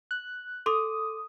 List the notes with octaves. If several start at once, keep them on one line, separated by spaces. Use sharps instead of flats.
F#6
A4 C6 D6 D#6